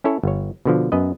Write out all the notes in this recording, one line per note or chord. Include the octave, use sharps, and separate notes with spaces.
C#4 E4 A4 C#5
G1 C#5
B2 D3 F3
F#2 B3 B4 D#5